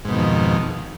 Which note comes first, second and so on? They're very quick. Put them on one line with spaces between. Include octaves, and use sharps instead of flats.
G#2 B2 D#3 F2